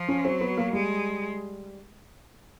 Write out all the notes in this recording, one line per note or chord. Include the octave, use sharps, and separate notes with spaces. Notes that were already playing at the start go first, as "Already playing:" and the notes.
Already playing: F3
C#4
F#3 C4
B3
A#3
G3 G#3